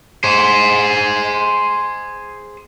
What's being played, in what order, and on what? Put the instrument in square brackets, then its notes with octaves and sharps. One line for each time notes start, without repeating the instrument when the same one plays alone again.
[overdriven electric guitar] G#4 C5